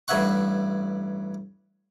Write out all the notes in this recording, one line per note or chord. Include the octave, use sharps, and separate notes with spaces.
A1 G2 C#5 E5 F#5 C#6